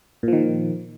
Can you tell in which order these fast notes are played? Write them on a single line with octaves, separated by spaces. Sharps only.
A#2 F3 D#3